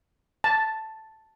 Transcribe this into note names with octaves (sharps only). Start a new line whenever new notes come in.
A5